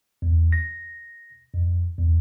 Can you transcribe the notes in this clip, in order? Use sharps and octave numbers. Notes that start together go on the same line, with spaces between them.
E2
A#6
F2
E2